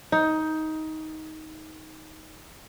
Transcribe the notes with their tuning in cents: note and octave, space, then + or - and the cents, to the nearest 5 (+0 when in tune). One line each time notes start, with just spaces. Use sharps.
D#4 +15